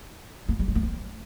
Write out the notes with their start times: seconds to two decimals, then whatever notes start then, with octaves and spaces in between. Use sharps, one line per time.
0.49 A#3
0.59 G3
0.68 G#3
0.75 A#3
0.83 C4